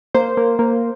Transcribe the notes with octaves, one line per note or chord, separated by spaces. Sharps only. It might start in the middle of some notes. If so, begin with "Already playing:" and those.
A#3 C5
A#3
A#3